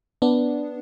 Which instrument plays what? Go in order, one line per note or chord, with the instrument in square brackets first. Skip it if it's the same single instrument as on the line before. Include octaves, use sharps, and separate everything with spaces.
[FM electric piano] B3 D4